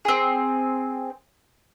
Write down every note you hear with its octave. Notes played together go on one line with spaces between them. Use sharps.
C4 G#4